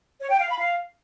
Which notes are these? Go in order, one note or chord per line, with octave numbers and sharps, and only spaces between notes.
C#5
G5
F5
B5
F5